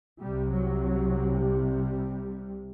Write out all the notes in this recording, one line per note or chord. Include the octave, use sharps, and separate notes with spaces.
C2 C3 G3
F#3
G3